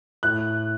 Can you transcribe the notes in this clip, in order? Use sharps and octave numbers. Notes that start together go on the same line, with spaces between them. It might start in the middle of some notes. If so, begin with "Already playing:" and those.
A2 F#6